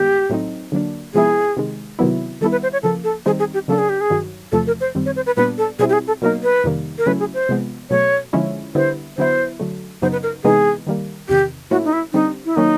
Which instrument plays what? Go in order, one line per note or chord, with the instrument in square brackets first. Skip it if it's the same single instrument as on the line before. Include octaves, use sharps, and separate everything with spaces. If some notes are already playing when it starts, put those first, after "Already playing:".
Already playing: [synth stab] G2 D#3 G#3 B3 [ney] G4
[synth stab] A2 F#3 A3 C4 D#4
D3 F#3 A#3 D4
[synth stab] C3 F3 G#3 B3 E4 [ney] G#4
[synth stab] C3 D#3 G#3
C3 D#3 F#3 B3 E4
[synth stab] D#3 G3 B3 E4 [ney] A4
[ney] B4
C5
C#5
[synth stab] C#3 F3 A#3 [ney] A4
[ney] A4
[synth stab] D#3 G3 C4 D#4 [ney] G#4
[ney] G#4
G4
[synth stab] C#3 F#3 A#3 D4 [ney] A4
[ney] G#4
G4
G#4
[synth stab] G2 D#3 F#3
[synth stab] E2 C3 F3 A3 [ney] A4
[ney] A#4
C5
[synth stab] F#2 D#3 G3 C4
[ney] C#5
C5
B4
[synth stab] A#2 G3 B3 D4 [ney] B4
[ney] A4
[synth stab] B2 G3 C4 E4 [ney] G#4
[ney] G4
G#4
A4
[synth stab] B2 F#3 A#3 D#4 [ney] A#4
[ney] B4
[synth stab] F2 C3 D#3 G3 A#3
[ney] A#4
[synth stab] C#3 F#3 A3 C#4 E4 [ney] B4
[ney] G#4
C5
[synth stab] C3 F3 G#3 B3
[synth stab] B2 F#3 A3 [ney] C#5
[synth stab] D3 F3 G#3 C#4 E4
[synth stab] D3 G3 B3 E4 [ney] C5
[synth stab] D3 F#3 B3 E4 [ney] C5
[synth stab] D3 F#3 A3
[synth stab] F#2 C#3 F#3 B3 D#4 [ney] C5
[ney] B4
A#4
[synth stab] C3 E3 G#3 B3 D#4 [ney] G#4
[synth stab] D#3 G3 A#3
[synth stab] E2 C3 D#3 [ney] G4
[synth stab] A2 F#3 A#3 C#4 E4 [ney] F#4
[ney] D#4
E4
[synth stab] D3 G3 C4 [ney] D#4
[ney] E4
[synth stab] D#3 F#3 A#3 C#4 [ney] D#4